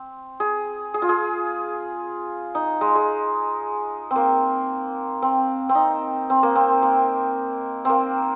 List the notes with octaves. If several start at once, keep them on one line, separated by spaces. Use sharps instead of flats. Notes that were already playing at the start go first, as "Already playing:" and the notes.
Already playing: C4
G#4
G#4
F4
G#4
D#4
G#3
G#3
C4
A#3
C4
C4
D#4
C4
A#3
C4
A#3
A#3 C4